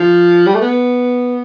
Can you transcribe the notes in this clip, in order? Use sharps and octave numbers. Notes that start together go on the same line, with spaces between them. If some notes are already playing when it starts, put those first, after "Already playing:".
Already playing: F3
G3
A3
B3